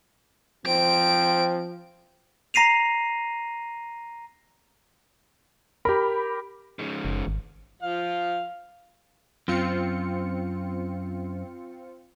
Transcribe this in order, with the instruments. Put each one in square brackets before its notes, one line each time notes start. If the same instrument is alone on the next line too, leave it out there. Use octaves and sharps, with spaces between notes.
[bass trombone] F3 [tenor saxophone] C4 [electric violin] D7
[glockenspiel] A#5 A#6 C7 D#7 F7
[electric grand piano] G4 A#4 [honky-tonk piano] B5
[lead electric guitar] G#2 C#3
[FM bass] F#1
G#1
[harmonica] F3 F5
[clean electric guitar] F#2 [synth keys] C4 F4 C#7